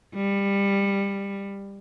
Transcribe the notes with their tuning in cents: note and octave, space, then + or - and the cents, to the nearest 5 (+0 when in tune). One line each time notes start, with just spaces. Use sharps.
G3 +20